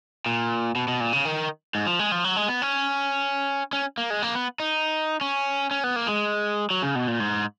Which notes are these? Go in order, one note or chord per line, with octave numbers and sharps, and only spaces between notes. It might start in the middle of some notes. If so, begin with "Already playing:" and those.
A#2
B2
B2
A#2
C#3
D#3
G#2
F3
G#3
F3
F#3
G#3
B3
C#4
C#4
A#3
G#3
A#3
B3
D#4
C#4
C#4
B3
A#3
G#3
F#3
C#3
B2
A#2
G#2